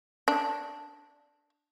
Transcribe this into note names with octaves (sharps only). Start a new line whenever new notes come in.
D4